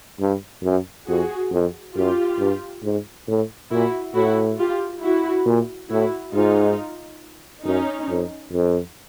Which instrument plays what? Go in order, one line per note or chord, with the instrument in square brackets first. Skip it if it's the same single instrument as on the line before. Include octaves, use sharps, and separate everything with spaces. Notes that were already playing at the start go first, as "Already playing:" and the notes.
[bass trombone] G2
F#2
[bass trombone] F2 [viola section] F#4 G#4
[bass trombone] F2
[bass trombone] F#2 [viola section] F4 G4
[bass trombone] G2
G#2
A2
[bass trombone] A#2 [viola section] E4 F#4
[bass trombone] A2 [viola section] E4 F#4
[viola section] F4 G4
E4 F#4
[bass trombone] A#2
[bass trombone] A2 [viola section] E4 F#4
[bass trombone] G#2 [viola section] D#4 F4
[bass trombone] F#2 [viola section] C#4 D#4
[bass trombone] F2
F2